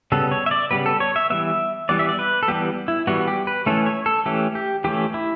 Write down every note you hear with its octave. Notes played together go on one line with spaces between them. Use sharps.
C#3 G3 B3 A4
C#5
E5
D5
C#3 G3 B3 B4
A4
C#5
E5
E3 G3 B3 E5
E3 G3 B3 D5
E5
D5
B4
A4
E3 G3 B3 G4
E4
E3 G3 B3 F#4
G4
B4
E3 A3 C#4 A4
C#5
A4
E3 A3 C#4 G4
G4
E3 A3 C#4 G4
E4